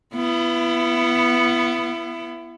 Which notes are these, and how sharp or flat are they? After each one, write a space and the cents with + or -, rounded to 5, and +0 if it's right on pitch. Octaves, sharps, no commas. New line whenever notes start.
B3 +0 E4 +30